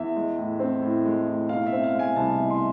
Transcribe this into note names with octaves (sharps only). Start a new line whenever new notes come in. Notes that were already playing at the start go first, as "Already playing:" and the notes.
Already playing: E2 E5
G#3
A2
C4
A2
G#3
A2
B2 F5
E5
C4
F5
G#3 G#5
C2 A5
B2
C6